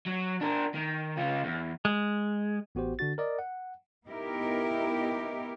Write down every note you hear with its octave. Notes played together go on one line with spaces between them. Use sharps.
F#3
D4 A#4
D#3
C#3 F4
E2
G#3
A1 B3 F#4 G4 C5
D3 D4 F#4 A6
A#4 D5 D#5
F#5
B3 D#4 E4 G4 A#4